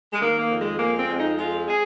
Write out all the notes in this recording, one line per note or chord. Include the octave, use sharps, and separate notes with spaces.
G#3
D#3 A#3
A#3
F2
G#3
G#3 A#3
C4
F2
D#4
G#3 F4
G#3 G#4